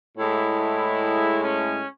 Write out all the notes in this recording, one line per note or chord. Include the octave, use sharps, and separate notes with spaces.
A2 G#3 E4
E4
C#4